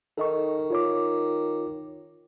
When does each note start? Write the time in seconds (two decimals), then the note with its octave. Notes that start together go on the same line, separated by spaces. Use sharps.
0.18 D#3 A4 D#5 C#6
0.70 F4 C#5 D6